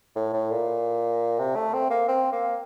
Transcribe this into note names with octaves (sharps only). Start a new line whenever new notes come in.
A2
A2
A#2
C3
A3
C4
A#3
C4
A#3